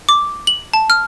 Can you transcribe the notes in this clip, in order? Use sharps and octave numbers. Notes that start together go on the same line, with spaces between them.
D6
F#7
A5
F6